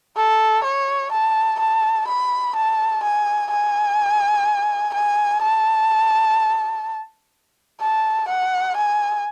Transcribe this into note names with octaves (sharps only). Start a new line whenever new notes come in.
A4
C#5
A5
A5
B5
A5
G#5
G#5
G#5
A5
A5
F#5
G#5